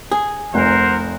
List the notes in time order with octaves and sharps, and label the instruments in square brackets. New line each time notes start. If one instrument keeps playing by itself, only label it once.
[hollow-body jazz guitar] G#4
[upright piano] F1 [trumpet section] A#4 C5 F#5